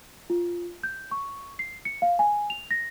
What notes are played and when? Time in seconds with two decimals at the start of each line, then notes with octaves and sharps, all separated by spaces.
0.30 F4
0.83 G6
1.11 C#6
1.59 C7
1.85 C#7
2.02 F5
2.19 G#5
2.50 F7
2.71 A#6